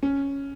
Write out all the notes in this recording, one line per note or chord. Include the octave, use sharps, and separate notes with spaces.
C#4